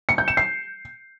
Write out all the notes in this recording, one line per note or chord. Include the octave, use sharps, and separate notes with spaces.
C#7
G6
E7
C7